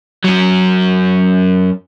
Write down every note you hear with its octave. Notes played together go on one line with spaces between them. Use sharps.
F#2 F#3